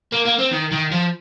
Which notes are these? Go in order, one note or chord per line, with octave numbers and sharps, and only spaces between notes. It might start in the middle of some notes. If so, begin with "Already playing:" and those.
A#3
A#3
C4
D#3
D#3
F3